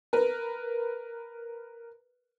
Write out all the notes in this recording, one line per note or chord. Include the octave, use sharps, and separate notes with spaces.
A#4 B4